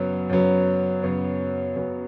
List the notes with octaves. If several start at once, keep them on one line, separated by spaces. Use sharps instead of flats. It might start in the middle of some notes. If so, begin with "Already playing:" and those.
Already playing: F#2 C#3 F#3 B3
F#2 C#3 F#3 B3
F#2 C#3 F#3 B3
F#2 C#3 F#3 B3